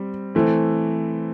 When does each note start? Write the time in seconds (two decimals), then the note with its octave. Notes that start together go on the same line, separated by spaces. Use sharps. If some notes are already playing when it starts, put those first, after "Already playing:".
Already playing: G3 C4
0.35 E3 A3 C4